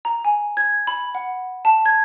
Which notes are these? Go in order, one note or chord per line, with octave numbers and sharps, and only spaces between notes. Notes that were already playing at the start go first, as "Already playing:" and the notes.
A#5
G#5
G#6
B5
F#5
A5
G#6